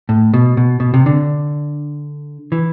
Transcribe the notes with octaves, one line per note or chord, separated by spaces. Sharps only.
A2
B2
B2
B2
C3
D3
E3